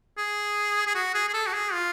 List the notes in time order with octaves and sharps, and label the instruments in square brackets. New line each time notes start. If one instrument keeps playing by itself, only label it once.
[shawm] G#4
G#4
F#4
G#4
G#4
A4
F#4
G#4
F4